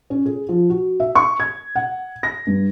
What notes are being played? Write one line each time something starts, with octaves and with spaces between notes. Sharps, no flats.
C#4
G#4
F3
F#4
E5
C#6
G#6
F#5
A#6
G2